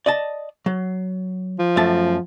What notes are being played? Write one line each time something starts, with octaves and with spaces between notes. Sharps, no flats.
D5 D#5 A5
F#3
F3
F#2 A3 A5